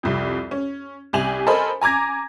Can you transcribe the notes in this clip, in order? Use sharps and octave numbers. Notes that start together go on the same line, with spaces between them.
C2 F2
C#4
C2 G4 G#5 F7 F#7
A4 A#4 C5 D#5 G#5 B5
G#5 A#5 D6 G#6 A#6